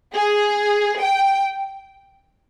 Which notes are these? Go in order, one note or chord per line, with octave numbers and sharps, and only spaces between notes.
G#4
G5